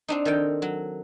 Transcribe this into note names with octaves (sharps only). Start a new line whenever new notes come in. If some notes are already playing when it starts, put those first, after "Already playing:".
C4 D4 D#4
D#3 A4 G5
F#3